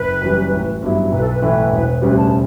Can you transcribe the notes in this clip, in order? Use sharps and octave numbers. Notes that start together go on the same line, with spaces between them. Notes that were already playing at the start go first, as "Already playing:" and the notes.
Already playing: F#1 B4
F#2 E3 G3
A1
G2 F#3 B3 E4
B1 B4
A4
B4
A2 E3 A3 E4 B4
E1 B4
B4
D2 C#3 G3 B4
A5